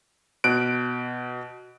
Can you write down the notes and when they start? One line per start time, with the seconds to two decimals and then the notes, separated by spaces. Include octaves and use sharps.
0.44 B2 F#6 D7